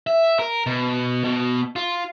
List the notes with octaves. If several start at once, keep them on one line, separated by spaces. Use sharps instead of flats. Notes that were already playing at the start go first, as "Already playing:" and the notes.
E5
A#4
B2
B2
F4